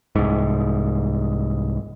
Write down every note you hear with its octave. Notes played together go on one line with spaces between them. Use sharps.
C2 G#2